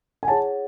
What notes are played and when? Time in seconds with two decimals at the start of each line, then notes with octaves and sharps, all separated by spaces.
0.23 G#5
0.27 E4 G#4 C#5 F#5 A5